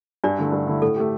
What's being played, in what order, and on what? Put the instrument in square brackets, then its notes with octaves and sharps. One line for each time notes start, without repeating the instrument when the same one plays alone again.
[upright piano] G2 [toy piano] D4 D5
[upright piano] D3 A3 E4
G2
D3 A3 E4
[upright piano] A2 [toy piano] A4
[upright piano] A3 G4